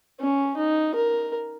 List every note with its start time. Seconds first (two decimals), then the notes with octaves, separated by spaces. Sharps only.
0.20 C#4
0.57 D#4
0.95 A#4